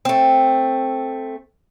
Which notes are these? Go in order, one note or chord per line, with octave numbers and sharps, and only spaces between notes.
A3 C4